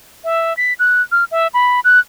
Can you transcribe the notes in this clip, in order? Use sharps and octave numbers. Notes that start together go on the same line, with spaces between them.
E5
B6
F#6
F6
E5
B5
F#6